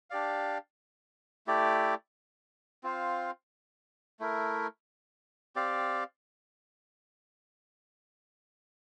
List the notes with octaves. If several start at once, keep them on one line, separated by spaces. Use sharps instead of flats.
D4 G4 D5 F5
A3 E4 G4 D5
C4 F4 C5 F5
A3 E4 A#4
C4 G4 D5 F5